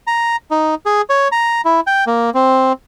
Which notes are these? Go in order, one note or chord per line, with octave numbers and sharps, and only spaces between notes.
A#5
D#4
G#4
C#5
A#5
E4
G5
A#3
C4